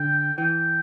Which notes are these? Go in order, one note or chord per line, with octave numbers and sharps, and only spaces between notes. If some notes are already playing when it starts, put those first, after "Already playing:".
Already playing: D3 G5
E3 G5